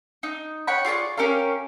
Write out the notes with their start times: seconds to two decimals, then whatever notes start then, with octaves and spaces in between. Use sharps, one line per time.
0.23 D#4
0.67 C#5 F#5 G5 B5
0.85 F4 G#4 D5 C#6
1.17 C#4 G4 A#4 F5